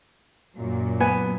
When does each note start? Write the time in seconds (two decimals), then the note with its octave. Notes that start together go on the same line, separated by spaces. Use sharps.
0.56 F#2 A#2 F#3
1.00 B3 G#5